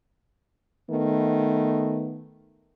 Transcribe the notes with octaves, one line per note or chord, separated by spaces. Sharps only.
D#3 A3 B3